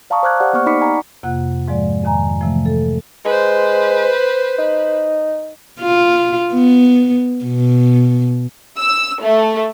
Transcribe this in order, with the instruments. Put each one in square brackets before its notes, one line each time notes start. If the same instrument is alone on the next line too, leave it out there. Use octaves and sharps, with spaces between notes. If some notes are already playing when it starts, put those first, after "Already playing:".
[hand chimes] D5 F5 A5 A#5 C#6 D#6
C5 D6 F6 F#6 G#6
G4 C5 D5 F#5
A#3 B3 G4 C#6 F6
D#4 D5 B5 D6 B6 C#7
F#5 G#5 A#5 B5 C#6
[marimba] F2 C3 A#3 F4 F#5 F#6
G#2 F3 G#3 D5
F2 D#3 G#5 A#5
C3 E3 F3 A3
A4
[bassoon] G#3 [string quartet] B4 C5
[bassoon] D#4
[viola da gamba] F4
B3
B2
[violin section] E6
A3